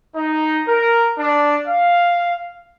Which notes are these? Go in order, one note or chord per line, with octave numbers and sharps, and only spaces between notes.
D#4
A#4
D4
F5